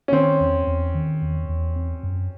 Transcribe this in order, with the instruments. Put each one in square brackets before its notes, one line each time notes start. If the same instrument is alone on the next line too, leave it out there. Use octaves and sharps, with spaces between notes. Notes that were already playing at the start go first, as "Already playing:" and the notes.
[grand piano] C#4
[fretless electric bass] D#3 [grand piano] C4
[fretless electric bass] E2
E2
D#3
E2
E2
C4
F#2